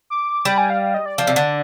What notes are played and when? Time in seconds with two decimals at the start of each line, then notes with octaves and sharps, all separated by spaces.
0.10 D6
0.45 G3 B5
0.58 G#5
0.70 F5
0.82 F5
0.94 D#5
1.06 D5
1.18 F3
1.27 C3
1.36 D3